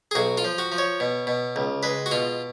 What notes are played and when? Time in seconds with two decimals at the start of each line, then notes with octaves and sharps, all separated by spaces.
0.11 G#4
0.15 B1 F#4
0.38 F4
0.44 F3
0.58 F#4
0.72 F3
0.78 C#5
1.00 B2
1.27 B2
1.56 C#2
1.83 G#3 B4
2.06 F#4
2.11 B2 F4